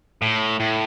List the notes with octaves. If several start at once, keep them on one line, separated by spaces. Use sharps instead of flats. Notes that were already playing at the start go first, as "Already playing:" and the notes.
A2
A2